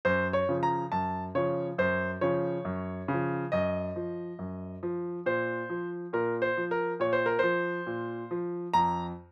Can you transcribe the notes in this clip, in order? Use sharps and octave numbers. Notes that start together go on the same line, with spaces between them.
F#2 C5
C#5
C#3 F3
A#5
F#2 A5
C#3 F3 C#5
F#2 C5
C#3 F3 C#5
F#2
C#3
F3
F#2 D#5
F3
F#2
F3
A#2 C5
F3
A#2 A#4
C5
F3
A#4
A#2 C#5
C5
A#4
F3 C5
A#2
F3
F2 A#5